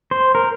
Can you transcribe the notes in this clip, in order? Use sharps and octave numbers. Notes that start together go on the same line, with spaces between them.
C5
A#4